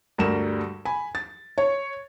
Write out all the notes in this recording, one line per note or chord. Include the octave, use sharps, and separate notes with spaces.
D2 G2 G3 A#4 E7
G#5 B5
A6
C#5